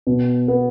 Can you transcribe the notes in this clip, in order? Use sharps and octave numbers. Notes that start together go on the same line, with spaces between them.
B2
B3